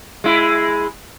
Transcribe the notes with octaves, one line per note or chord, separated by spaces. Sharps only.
G#3 E4